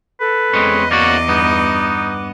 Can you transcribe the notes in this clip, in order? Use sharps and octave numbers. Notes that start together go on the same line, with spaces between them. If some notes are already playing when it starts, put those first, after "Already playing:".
A4 B4
E2 G#3 C4 C#4 D#5
A#3 C#4 F#4 D5 D6
G2 B3 D#4